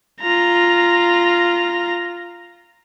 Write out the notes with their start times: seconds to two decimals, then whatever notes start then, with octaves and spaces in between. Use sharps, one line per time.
0.21 F4 A#5